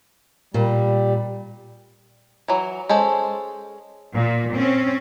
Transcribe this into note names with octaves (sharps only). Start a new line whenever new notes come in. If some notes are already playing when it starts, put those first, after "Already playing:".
A#2 G3
E3 F#3
G#3 C#4 A4 C5
A#2
C4 C#4